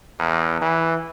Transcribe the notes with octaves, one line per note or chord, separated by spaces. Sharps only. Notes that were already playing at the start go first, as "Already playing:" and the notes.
E2
E3